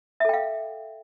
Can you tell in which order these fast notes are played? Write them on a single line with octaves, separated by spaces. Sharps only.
E5 A4 G5 F5